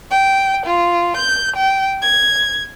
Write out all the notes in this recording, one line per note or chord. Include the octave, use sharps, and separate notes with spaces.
G5
F4
G6
G5
G#6